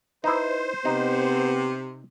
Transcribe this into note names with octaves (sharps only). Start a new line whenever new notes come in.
D#4 E4 B4 C5
C3 B3 D#4